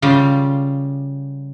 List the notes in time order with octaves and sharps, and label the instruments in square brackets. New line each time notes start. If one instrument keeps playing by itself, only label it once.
[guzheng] C#3 G3 F4 G4